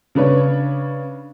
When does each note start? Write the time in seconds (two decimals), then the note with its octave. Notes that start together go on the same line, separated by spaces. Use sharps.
0.15 C#3 D4 B4 C#5